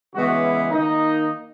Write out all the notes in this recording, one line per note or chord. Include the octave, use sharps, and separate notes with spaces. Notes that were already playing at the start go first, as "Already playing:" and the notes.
C#3 E3 G#3 B3 F#4
E4
D#3 A#3 D#4